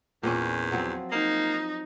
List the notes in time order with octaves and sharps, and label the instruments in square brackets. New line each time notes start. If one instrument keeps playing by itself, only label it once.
[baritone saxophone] E2 [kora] A#2 C4 C#4
[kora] F3 F#3 C4
[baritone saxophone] A#3 [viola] D#4